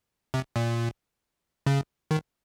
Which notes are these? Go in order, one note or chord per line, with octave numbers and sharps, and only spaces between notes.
C3
A#2
C#3
D#3